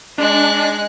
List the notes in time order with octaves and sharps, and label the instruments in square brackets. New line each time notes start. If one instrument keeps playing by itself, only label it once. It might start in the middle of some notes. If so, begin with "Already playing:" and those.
[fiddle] G#3 F#6 [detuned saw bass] D4